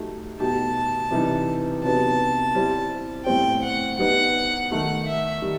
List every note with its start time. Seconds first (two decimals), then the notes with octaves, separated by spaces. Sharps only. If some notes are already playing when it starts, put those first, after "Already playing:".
Already playing: F#3 A3 D#4 G4
0.39 B2 A3 D#4 G4 A5
1.11 C3 E3 G3 D#4
1.83 C3 F#3 B3 D#4 A5
2.55 G3 C4 E4
3.26 A2 G3 C4 G5
3.63 F#5
3.98 G3 B3 D#4 F#5
4.71 D#3 A3 D#4 F#5
5.06 E5
5.42 D#3 G3